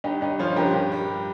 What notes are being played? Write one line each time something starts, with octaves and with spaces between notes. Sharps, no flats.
G2 D#4 G4
G2 D#4
F3 C#4 F4
G2 G4 A#4
G2
G3